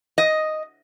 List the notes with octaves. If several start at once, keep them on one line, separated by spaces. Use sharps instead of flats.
D#5